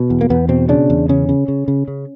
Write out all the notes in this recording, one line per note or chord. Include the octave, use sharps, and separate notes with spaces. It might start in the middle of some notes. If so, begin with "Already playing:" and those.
Already playing: B2
E2
A#3
E2 B3
B2 C4
C#3 D4
E2
C#3 C#4
C#3
C#3
C#3
C#3